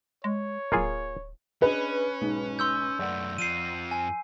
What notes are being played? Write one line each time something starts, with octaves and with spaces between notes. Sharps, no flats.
G#3 C#5
D1 A#3 F4 G#4
C#4 D4 G#4 B4 D#5
B1 G#2 G#3
C6 E6 G6
F#2 A3 D5 F#5
F2 F3 C7 D#7
G#5